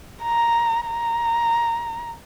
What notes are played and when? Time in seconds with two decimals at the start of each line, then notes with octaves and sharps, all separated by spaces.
0.23 A#5
0.87 A#5